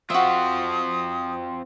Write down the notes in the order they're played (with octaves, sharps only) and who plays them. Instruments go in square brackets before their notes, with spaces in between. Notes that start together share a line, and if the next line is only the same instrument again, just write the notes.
[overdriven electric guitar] C4 F4 [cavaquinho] F#4 E5 [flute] D#6